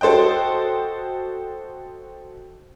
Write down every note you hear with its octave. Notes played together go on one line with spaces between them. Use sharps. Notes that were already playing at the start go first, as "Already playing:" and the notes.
F#4 A4 C5 D#5 G5